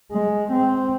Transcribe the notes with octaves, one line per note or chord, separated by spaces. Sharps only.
G#3
C4